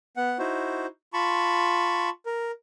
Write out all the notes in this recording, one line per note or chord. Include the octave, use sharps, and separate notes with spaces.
B3 F#5
D#4 E4 F#4 C5
F4 A5 B5 C#6
A#4